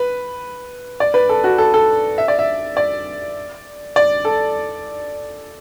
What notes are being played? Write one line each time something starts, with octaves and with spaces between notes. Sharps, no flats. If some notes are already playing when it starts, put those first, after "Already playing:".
Already playing: B4
D5
B4
A4
F#4
A4
A4
E5
D5
E5
D5
D5
A4